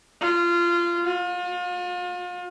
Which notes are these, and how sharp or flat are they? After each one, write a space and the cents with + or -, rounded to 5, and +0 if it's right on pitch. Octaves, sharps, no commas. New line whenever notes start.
F4 -20
F4 +40